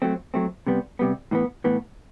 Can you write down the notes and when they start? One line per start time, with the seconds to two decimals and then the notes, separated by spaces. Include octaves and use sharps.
0.02 F#3 A3 C4
0.34 F#3 A3 C4
0.67 C3 G3 B3
0.99 C3 G3 B3
1.31 A2 E3 B3
1.64 A2 E3 B3